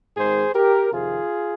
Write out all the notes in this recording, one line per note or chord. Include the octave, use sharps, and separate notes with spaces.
G#1 G#2 D#3 G#4 C5
G4 A#4
F2 C3 D#3 F4 G#4